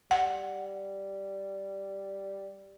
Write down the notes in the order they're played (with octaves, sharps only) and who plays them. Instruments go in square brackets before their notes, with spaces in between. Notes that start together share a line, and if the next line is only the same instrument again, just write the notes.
[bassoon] G3 [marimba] F#5